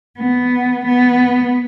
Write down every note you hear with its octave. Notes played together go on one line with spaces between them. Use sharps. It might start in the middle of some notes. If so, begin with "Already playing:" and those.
B3
B3